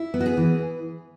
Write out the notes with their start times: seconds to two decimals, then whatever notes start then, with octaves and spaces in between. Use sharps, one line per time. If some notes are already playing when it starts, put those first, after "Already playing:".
Already playing: E4
0.14 B3
0.20 F#4
0.26 G#4
0.37 E3